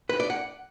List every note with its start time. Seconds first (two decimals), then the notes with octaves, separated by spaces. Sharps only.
0.09 B4
0.20 D5
0.30 F#5